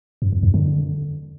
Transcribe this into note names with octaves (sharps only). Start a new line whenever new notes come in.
F#2
E2
F#2
D3